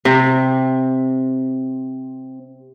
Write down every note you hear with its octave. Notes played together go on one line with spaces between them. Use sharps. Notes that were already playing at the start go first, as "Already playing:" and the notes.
C3 C4